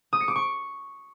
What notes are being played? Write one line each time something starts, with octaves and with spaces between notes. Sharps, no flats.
D#6
C#7
D6
C#6